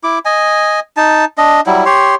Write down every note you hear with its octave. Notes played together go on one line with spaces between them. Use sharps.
E4 D6
D#5 G#5
D#4 A5
D4 D#5
F#3 G3 E4
G4 C#5 C6